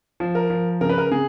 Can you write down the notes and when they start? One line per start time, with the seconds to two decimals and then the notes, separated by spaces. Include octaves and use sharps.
0.20 F3
0.35 A#4
0.50 F3
0.81 C#3 A#4
0.89 B4
0.98 A#4
1.11 C#3 G#4